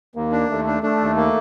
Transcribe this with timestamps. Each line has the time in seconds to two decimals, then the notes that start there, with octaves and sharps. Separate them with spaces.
0.15 D#2 A#3
0.32 D4
0.50 D#2 A3
0.67 D4
0.83 A3 D4
1.01 D#2
1.17 A#3